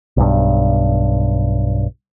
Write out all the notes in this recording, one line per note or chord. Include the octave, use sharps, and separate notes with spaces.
B1 G2